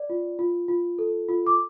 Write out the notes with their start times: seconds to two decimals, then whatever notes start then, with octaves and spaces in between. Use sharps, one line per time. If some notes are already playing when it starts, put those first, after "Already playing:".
Already playing: D5
0.10 F4
0.39 F4
0.68 F4
0.99 A4
1.29 F4
1.47 D6